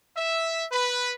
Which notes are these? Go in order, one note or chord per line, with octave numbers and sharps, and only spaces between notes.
E5
B4